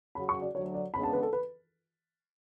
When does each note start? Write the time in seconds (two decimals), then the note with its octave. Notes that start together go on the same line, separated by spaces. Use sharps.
0.15 C#3 F#3 C#4 F#4 B5
0.29 C#6
0.41 D5
0.54 D2 D3 F#3 C#5
0.74 D5
0.93 C#3 G#3 B3 D4 B5
1.03 A5
1.13 B4
1.23 A4
1.33 B4